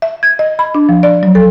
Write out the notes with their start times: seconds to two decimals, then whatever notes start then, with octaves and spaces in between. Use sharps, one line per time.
0.02 E5
0.23 G#6
0.39 D#5
0.59 B5
0.75 D4
0.89 F3
1.03 D5
1.23 F#3
1.35 A4